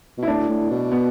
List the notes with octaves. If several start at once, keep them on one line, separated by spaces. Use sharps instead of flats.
B2 E4
A2 D4
A2
B2
B3